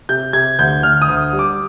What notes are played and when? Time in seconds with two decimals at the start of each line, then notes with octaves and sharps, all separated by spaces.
0.09 C3 G6
0.33 C3 G#6
0.59 D2 G6
0.83 D2 F6
1.02 D#6
1.08 D2
1.33 G3
1.39 D6